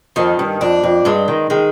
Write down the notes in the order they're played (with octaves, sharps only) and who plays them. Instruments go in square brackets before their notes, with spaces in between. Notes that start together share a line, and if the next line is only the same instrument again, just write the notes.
[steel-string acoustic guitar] F2 [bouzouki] D#3
[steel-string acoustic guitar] G2
[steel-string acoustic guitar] F2 [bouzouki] D4
[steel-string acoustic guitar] F2
[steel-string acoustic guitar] G2 [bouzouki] G#3
[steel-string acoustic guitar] D#3
[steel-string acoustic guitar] D#3 [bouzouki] G#3